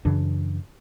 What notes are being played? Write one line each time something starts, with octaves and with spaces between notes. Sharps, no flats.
F#2 C#3 E3 D4